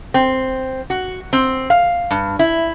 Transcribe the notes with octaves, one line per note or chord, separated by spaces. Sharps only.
C4
F#4
C4
F5
G2
E4